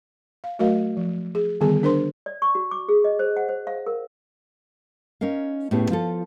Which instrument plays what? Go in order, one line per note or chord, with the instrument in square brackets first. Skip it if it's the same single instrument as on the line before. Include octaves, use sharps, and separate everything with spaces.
[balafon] F5
F#3 A3 F#4 A#4 D#5 F5
F3
G#4
D3 D#3 G3 B3 G#4 G#5
D4 A#4 C5 C6
[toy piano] D5
C#6
F#4
D6
G#4
D#5
C5
F#5
C5
F5
A#4
[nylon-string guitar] C#4 D#4 A#4 F5
A2 A3 B3 C#4 G4 G#4
F3 F4 A4